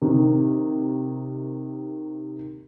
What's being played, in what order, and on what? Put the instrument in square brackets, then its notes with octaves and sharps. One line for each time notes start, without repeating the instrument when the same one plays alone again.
[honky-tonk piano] C3 D#3